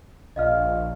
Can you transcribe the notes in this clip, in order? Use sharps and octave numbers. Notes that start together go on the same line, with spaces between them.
A#1 D#5 F5 F6